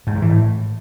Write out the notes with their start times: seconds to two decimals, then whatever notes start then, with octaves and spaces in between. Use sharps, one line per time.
0.07 G#2
0.14 G2
0.22 E3
0.30 A2